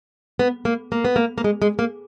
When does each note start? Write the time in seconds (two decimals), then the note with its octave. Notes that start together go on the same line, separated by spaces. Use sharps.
0.39 B3
0.65 A#3
0.92 A#3
1.05 B3
1.16 A#3
1.38 A#3
1.44 G#3
1.62 G#3
1.79 A#3